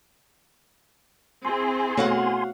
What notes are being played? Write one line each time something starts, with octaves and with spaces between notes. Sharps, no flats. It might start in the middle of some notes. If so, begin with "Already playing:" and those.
C4 E4 G#4 G#5 C6
B2 A3 F#4 C#5 F5 F#5